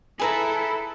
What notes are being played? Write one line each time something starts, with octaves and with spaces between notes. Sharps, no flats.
E4 G#4 A4 B4 A#5